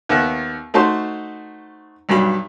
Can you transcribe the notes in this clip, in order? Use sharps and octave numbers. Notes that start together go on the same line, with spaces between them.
D#2 B3 E5 F#6
A3 D#4 F#4 C5 A5 C6
B1 G2 F#3 B5